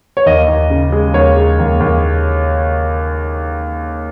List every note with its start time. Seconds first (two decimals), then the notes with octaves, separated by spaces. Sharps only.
0.17 C#5
0.26 D#2 D#5
0.48 D#2
0.70 C#3
0.92 G#3
1.14 D#2 C#5
1.37 G#3
1.59 D#2
1.80 D#2